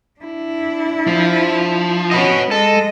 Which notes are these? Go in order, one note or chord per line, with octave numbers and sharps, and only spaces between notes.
D4 E4
F3
C#4 F#4 B4 D#5
G#3 A4 D#5